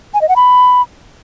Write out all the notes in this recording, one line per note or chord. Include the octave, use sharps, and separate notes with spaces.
G#5
D#5
F#5
B5